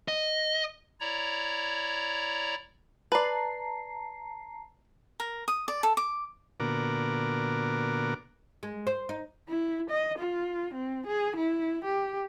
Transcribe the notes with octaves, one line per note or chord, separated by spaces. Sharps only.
D#5
E4 C#5 D5 A#5
B4 D5 A5 A#5 C7
A#4
D#6
D5
A4
D6
A#2 D3 B3 F#4 A#4 D6
G#3
C5
D#4
E4
D#5
F4
C4
G#4
E4
G4